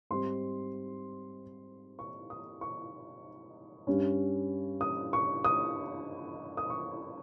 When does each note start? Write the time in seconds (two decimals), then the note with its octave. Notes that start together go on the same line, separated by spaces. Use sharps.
0.10 G#2 G3 C4 D#4 C6
1.99 C#6
2.30 D#6
2.61 C#6
3.87 G2 G3 C#4
4.81 D#6
5.13 C#6
5.44 D#6
6.57 D#6
6.70 C#6